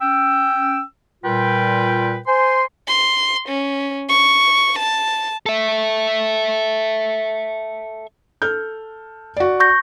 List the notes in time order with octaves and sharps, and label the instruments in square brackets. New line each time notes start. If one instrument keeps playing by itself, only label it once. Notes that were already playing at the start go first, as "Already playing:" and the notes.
[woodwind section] C#4 G5 E6
A#2 G3 F4 A#4 B4 G5
C5 G#5 C6
[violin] C6
C#4
C#6
A5
[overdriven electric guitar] A4 E5
[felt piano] A4 F6 G6
F#4 D5
[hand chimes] C#6 G6 A#6